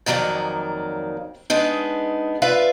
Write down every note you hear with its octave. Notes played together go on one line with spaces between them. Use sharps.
F2 D#3 F#3 A#3 D5
G#3 B3 D4 D#4
F4 B4 D5 E5 F5